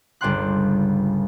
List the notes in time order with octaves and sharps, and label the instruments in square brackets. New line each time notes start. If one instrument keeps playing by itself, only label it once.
[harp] G1 C#2 D5 G5 C6 F#6